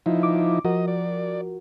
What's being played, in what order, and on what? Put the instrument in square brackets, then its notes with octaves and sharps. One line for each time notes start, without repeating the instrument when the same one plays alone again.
[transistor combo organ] F3 D#4 E4
[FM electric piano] D6
[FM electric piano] F3 F#4 A#4 [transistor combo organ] D#5
[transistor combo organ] D5